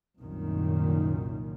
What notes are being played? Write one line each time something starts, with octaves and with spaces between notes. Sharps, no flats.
C2 F#2 A#2 D#3